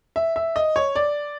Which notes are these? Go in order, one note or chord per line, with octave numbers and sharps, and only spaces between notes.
E5
E5
D#5
C#5
D5